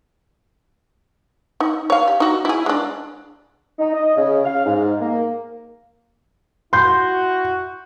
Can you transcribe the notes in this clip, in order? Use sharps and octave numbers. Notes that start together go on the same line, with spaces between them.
D#4
C#5 F5
G4
D#4 F#4
E4 G#4
G#3 D4
D#4
D#5
C#3
F5
G#2
A#3
E4 F#4 C6 G6